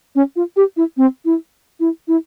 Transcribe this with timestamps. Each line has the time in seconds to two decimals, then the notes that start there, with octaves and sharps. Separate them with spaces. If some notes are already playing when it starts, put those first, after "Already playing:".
0.15 C#4
0.36 F4
0.57 G4
0.77 E4
0.97 C4
1.25 E4
1.80 E4
2.08 E4